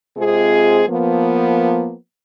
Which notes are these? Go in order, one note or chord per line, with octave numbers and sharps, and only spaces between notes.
C3 G#3 C4 F4 G#4
F3 A#3 B3